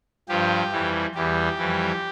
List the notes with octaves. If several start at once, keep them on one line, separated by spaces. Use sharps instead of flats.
G2 F3 G4
F2 E3 G3
E2 E3 G3 G4
F2 E3 G3